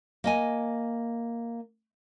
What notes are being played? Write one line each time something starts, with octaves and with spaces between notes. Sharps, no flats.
A#3 D#5 G#5